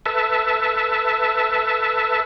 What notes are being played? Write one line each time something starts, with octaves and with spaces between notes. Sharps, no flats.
A4 B4 E5 A5